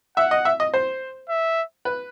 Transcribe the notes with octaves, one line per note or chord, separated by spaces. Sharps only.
E5 F#5
D#5
E5
D#5
C5
E5
B4